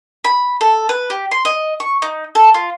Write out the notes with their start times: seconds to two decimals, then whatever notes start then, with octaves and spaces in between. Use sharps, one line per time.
0.24 B5
0.61 A4
0.89 B4
1.10 G4
1.31 C6
1.45 D#5
1.80 C#6
2.02 D#4
2.35 A4
2.54 F4